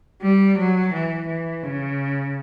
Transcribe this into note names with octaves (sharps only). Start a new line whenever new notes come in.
G3
F#3
E3
E3
C#3